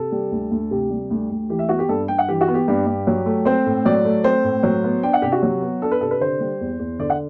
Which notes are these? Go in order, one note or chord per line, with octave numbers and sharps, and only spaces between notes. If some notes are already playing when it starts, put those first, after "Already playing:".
Already playing: C3 A4
G3
D2
D2
C3 G4
G3
D2
D2
E3 G4
E5
B3 F#4
G4
G2 A4
G2 G5
F#5
E3 G4
F#4
B3
G4
G2 G4
G2
F#3
A3
C4 C5
A2
F#3 D5
A3
C4 C5
A2
F#3
B3
D4 G5
F#5
C3 G4
F#4
F#3
B3
D4 A4
B4
C3 A4
B4
D3 C5
G3
E2
E2
D3 D5
F#5